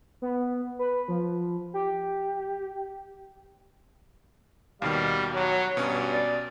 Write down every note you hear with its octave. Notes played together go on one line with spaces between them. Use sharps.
B3
B4
F3
G4
D#2 B2 D#3 G3 F5
F#3 C#5
G2 B2 C#4
D5